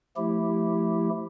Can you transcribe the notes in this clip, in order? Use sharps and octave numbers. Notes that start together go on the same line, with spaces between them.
F3 A3 E4 G4